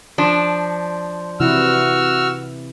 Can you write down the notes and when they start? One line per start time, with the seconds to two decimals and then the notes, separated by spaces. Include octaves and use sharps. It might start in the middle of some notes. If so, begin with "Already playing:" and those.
0.18 F3 D4
1.40 C3 E3 E4 F#4 E6 F6